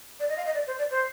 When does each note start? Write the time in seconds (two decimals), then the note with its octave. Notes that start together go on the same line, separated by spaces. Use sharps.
0.20 D5
0.29 D#5
0.37 F5
0.46 D#5
0.55 D5
0.67 C5
0.78 D5
0.91 C5